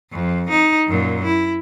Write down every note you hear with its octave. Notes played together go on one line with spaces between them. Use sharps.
F2
D#4
F#2 A#2
E4